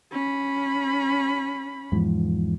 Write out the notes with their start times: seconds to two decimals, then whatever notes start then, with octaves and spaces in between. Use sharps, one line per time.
0.11 C#4 B5
1.92 E2 G#2 F3